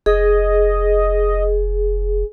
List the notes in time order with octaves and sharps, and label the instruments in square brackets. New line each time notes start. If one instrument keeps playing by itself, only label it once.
[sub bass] F1 [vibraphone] G#4 [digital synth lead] D#5